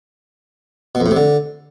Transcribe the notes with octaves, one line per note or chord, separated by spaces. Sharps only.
B2
F2
A2
C3
D3